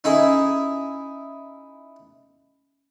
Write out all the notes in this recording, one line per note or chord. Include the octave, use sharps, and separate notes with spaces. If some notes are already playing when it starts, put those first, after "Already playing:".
C#4 D#4 E4 G#4